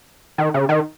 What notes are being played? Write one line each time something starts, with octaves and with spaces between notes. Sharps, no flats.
D#3
C#3
D#3